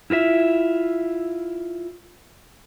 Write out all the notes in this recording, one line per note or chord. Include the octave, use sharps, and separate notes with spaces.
E4 F4 A#4 E5